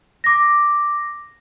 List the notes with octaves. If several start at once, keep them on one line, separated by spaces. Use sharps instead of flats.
D6 A#6